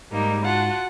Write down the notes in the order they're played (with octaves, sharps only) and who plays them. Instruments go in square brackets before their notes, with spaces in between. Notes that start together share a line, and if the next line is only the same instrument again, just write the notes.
[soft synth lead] G#2 [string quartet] G3 A#3 D#4
[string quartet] F4 F#4 A5 [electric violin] F#5